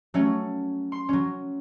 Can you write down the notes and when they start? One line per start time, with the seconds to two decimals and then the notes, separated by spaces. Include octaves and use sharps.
0.14 F#3 A3 C#4
0.92 C6
1.09 F#3 C#4